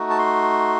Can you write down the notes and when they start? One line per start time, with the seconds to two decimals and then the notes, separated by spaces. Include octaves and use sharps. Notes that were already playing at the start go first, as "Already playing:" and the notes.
Already playing: A3 D#4 F#4
0.10 A5
0.19 C6